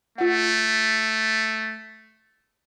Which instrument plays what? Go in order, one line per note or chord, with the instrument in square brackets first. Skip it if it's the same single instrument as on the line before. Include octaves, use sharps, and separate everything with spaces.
[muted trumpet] A3 [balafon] F4 F#5